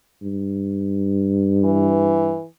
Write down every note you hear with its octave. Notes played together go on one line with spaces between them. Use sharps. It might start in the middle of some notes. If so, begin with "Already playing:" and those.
G2
E3